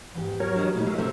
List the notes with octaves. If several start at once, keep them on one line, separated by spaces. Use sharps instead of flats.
E2 G#2 G4
F#3 A#4 C#5
D4 C5 D#5
A#2 G3 A3 D#4 E4
G#3 F#4 E5 F5
C3 A3 C#4 A4 A#4 C5